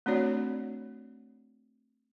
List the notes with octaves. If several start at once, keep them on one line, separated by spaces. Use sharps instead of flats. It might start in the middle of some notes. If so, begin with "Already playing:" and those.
A3 C4 D4 F#4 C#5 D5